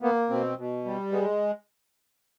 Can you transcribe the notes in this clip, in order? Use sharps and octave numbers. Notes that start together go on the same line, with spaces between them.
A#3 B3
B2 C4
B2
G3
G#3 B3